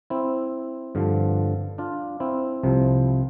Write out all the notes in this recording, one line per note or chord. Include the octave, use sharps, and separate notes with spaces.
C4 E4
G2 D3 F3
D4 F4
C4 E4
C2 C3 F3